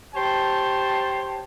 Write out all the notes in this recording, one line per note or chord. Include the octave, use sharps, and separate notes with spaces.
G4 C5 C#5 A5